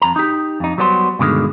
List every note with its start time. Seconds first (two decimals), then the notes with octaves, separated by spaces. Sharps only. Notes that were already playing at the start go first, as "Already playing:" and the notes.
0.02 F2 A#5
0.16 D#4 G4
0.60 F2 D#4
0.78 F#3 G3 B3 G4 C5
1.19 G2 B2 D3 D#3 G#3